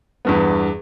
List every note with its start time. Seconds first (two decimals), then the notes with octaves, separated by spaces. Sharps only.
0.25 E2 G2 B3